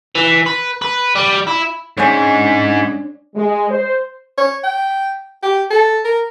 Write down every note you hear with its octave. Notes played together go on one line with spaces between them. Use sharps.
E3
B4
B4
G3
E4
G#2 G#3 C#4 D4 G#5
G#3
C5
C#5
G5
G4
A4
A#4